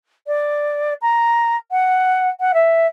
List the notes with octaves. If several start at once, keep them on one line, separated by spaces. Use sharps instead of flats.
D5
A#5
F#5
F#5
E5